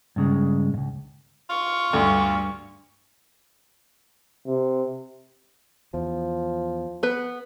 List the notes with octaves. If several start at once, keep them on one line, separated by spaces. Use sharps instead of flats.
G2 C#3 G#3
C#2 G2
F4 C#6
D2 G2 A3
C3
E2 F3
B3 B4